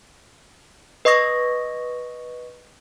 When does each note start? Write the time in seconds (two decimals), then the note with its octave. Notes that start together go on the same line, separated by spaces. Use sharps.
1.05 B4 D#5 C#6 D#6 A#6